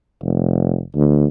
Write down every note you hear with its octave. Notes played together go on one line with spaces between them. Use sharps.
F1
D2